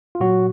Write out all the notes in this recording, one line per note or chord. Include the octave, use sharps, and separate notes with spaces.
F4
A#2 F#3 F#4